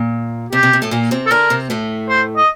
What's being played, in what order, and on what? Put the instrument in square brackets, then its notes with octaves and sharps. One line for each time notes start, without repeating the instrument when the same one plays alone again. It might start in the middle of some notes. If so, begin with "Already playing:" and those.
Already playing: [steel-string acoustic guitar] A#2
[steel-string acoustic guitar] C3 [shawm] G4
[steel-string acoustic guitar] C3
C3
A2 A3
A#2 A#3
C3 C4
[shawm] A4
[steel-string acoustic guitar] D3 D4 [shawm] A#4
[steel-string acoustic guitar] C3 C4
A2 A3
[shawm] C5
D#5